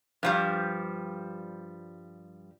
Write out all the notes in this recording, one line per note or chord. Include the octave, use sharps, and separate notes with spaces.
G2 F3 G3